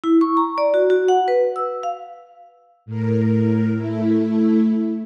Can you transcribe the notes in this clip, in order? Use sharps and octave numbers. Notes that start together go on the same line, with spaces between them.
E4
C#6
A#5
D5
F#4
F#4
F#5
B4
E6
F5
A2 A#4
A3 E4